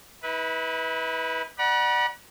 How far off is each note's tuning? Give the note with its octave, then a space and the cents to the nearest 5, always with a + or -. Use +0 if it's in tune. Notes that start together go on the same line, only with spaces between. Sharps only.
E4 -40 B4 -5
D5 +30 F#5 +10 B5 -45